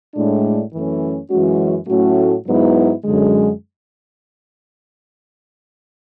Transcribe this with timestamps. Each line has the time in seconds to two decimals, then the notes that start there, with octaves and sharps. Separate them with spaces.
0.15 A2 G#3 D4
0.73 F#2 E3 A3 C#4
1.30 F#2 E3 G#3 C#4 F#4
1.88 A2 F#3 A3 C#4 F#4
2.46 G#2 F#3 B3 E4
3.04 F#2 D3 G#3